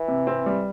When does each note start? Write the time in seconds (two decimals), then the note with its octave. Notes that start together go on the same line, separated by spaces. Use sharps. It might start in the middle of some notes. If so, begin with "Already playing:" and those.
Already playing: E3
0.08 C3
0.27 C4
0.46 G3